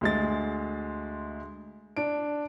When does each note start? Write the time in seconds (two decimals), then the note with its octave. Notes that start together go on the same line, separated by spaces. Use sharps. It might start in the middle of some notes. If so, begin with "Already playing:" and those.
0.01 D2 G#3 A6
1.97 D4 D7